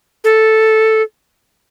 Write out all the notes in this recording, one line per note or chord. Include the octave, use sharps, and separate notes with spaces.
A4